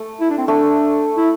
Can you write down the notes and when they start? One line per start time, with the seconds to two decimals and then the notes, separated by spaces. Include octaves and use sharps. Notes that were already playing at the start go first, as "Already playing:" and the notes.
Already playing: A3
0.21 E4
0.30 D4
0.38 C4
0.47 A3 D4
1.17 E4